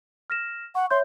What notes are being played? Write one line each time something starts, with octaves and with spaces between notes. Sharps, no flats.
F6 A#6 E7
F#5 C#6
C#5 E5 C6 G6